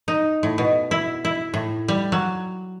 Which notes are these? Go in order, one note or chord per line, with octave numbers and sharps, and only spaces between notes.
D#4
A2
B2
E4
E4
A2
G3
F#3